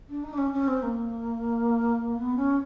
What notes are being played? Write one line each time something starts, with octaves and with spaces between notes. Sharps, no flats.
D4
D#4
D4
C#4
C#4
C4
A#3
B3
C#4